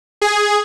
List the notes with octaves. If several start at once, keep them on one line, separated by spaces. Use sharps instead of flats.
G#4